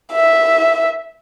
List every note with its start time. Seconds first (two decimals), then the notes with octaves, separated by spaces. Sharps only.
0.13 E5